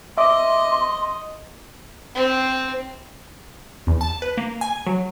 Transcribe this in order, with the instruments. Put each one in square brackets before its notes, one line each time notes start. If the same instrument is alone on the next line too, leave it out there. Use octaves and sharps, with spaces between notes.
[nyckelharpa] D#5 [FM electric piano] E5 D6 [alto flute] C6
[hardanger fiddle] C4
[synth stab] E2
A5
B4
A#3
G#5
F#3